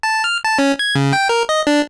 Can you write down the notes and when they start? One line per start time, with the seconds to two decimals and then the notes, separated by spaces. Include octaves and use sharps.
0.03 A5
0.24 F6
0.44 A5
0.59 C#4
0.79 G#6
0.95 C#3
1.13 G5
1.29 A#4
1.49 D#5
1.67 D4